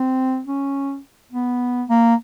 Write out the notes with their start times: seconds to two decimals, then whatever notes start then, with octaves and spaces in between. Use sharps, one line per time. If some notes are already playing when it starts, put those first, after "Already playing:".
Already playing: C4
0.47 C#4
1.32 B3
1.89 A#3